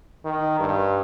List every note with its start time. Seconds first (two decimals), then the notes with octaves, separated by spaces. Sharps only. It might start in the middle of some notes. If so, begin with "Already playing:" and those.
0.25 D#3
0.60 G2